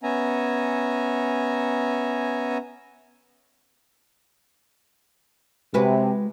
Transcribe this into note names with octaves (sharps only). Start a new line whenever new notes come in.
B3 C#4 E5 G#5 A#5
C3 G#3 F#4 B4